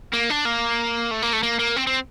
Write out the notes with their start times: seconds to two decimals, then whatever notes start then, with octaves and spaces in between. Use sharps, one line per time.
0.13 A#3
0.30 D4
0.45 A#3
1.11 A3
1.22 A#3
1.33 A3
1.43 A#3
1.59 A#3
1.77 C4
1.87 C4